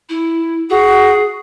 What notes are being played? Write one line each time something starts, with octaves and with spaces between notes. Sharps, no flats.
E4
F#4 G#4